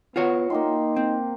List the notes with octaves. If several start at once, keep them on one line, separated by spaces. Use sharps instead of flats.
B3 F4 F#4 C#5
A#3 D#4 G5 C6
C4